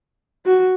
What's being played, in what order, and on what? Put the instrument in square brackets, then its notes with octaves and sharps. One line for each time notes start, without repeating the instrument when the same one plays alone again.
[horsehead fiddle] F#4